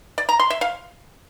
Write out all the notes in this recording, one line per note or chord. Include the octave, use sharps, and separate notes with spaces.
D5
A#5
C6
E5
F5